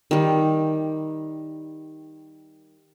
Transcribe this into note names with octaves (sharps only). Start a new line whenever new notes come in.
D#3 G3